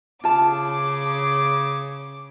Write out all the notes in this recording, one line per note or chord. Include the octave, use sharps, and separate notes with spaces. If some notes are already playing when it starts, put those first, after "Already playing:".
C#3 F4 A5 D6